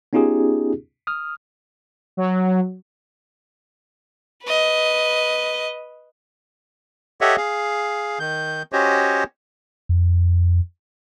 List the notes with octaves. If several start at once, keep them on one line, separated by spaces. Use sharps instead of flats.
B3 C#4 D#4 F4 G4 G#4
D#6 F6
F#3
B4 D#5
G4 A4 C#5 D#5 E5 F#5
G#4 F5
D#3 G6
C#4 F#4 G4 C5 C#5 D#5
F2